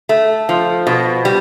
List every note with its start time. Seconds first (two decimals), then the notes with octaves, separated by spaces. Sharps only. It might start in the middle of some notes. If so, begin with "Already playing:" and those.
0.09 A3
0.49 F3
0.87 B2
1.25 G3